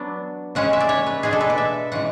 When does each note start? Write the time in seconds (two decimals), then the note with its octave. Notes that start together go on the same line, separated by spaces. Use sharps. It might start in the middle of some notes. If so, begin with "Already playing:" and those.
Already playing: F#3 B3 D4
0.55 C#3 G#3 C#4 F#5
0.73 E5
0.80 D5
0.89 C#5
1.06 B4
1.23 B2 G#3 D4 G#4
1.33 A4
1.41 B4
1.50 D5
1.58 E5
1.92 C#3 E3 G#3 F#5